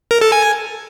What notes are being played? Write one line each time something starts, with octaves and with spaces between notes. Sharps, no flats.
A#4
A4
G#5